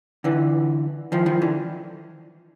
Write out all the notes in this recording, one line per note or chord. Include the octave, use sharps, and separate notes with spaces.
D3 E3
D#3 F3
D#3 F3
D3 E3